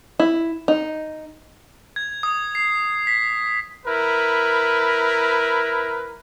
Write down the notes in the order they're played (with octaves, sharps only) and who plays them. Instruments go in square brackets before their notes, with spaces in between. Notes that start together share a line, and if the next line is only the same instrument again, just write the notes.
[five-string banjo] E4
D#4
[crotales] G#6
D#6
C7
B6
[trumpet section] E4 A#4 B4